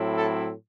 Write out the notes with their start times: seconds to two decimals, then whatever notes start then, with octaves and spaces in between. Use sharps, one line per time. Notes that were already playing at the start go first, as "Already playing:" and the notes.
Already playing: A2 F#3 C4 E4
0.17 A4